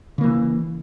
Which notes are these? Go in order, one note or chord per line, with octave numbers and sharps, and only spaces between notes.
C#3 E3 A#3